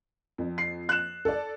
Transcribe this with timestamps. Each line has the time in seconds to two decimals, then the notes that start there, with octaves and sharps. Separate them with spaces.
0.38 F2
0.58 C7
0.89 F#6 E7
1.25 A4 D5